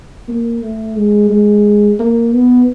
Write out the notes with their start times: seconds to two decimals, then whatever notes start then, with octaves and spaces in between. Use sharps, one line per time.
0.28 A#3
0.62 A3
0.96 G#3
1.30 G#3
2.00 A#3
2.33 B3